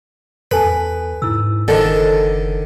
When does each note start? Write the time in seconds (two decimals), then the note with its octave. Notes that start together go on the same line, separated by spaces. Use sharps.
0.51 E2 A4 B4 G#5 A5
1.22 G#2 E4 E6
1.68 F#1 D3 D#3 G#4 A4 C5